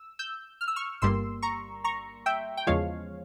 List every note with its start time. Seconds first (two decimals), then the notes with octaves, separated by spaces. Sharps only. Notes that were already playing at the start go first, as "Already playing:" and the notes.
Already playing: E6
0.19 E6 G6
0.61 F6
0.68 E6
0.76 C#6 F6
1.02 G1 G2 G3 A#3 C6 E6
1.42 A#5 C#6
1.84 A#5 C#6
2.26 E5 G5
2.57 G5
2.67 E2 C#3 F3 G#3 C#5 F5